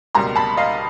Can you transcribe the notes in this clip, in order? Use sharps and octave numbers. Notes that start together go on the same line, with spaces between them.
C#2 B2 G3 A#3 A#5 C6
A5 B5
D#5 F5